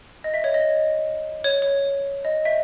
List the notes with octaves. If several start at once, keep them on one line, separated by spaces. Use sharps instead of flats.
D#5
E5
C#5
D#5
C#5
C#5
D#5
E5